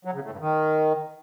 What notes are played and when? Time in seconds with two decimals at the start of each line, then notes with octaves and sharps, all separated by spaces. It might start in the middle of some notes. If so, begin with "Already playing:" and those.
0.05 F#3
0.14 C#3
0.22 A2
0.31 G2
0.40 D#3